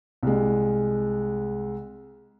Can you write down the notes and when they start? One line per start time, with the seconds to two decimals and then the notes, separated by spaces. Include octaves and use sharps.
0.23 C2 G#3